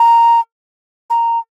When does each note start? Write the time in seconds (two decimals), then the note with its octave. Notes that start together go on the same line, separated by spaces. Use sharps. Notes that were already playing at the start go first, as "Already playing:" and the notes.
Already playing: A#5
1.10 A#5